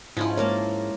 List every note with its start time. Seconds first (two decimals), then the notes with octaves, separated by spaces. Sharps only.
0.17 G#2 F3 C#4 E4
0.37 G#3 A#3 A#4 C#5 A5